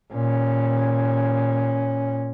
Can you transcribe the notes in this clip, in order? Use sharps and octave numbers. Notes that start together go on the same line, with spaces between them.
A#2 C#4